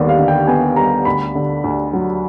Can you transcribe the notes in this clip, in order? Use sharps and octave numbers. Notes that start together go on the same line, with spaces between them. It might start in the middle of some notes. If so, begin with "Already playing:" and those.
Already playing: D#2 D3 G3 B3
F5
D3
G5
B3 G#5
G3 A#5
D2 B5
D3
D2
F#3